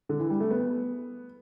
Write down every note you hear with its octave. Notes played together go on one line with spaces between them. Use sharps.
D3
E3
G3
A3
B3